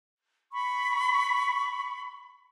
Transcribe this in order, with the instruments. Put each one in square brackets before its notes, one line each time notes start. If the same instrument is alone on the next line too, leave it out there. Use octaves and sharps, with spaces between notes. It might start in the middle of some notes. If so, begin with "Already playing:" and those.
[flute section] B5 C#6